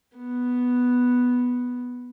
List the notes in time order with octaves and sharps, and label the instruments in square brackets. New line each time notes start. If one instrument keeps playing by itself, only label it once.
[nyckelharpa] B3